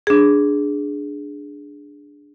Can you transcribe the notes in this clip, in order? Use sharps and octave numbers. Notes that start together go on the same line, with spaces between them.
D4 G#4